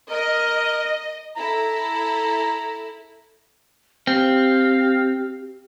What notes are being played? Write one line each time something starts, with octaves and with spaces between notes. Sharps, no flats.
A#4 D#5
E4 A4 A#5
C4 G4 F5